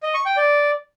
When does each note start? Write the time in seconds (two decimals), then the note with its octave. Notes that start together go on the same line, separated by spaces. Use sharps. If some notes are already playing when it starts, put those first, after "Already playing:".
0.03 D#5
0.14 C#6
0.26 G5
0.37 D5